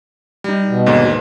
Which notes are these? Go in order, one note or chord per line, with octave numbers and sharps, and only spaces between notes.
G3 D#4
B2
D#2 G#2 D3